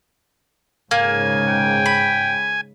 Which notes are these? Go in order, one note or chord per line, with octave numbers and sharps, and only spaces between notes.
G#2 C#3 A#3 G#5
G5
B5